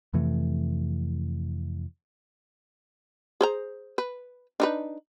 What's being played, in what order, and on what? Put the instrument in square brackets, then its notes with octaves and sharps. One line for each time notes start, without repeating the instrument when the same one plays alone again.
[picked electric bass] F2 C3 E3 A3
[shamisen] G#4 C5 A#5
B4
D4 D#4 B4